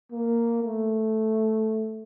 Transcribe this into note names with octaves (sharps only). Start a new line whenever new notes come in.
A#3
A3